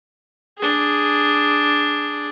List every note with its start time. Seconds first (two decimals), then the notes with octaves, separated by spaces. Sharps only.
0.59 D4 G#4